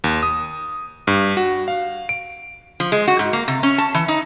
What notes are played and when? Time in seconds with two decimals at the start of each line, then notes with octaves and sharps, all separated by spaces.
0.04 D#2
0.23 D#6
1.07 G2
1.37 F#4
1.68 F5
2.09 D7
2.80 F3
2.92 G#3
3.07 F#4
3.19 G#2
3.33 A#3
3.48 C3
3.63 C#4
3.78 A5
3.94 E3
4.08 D#4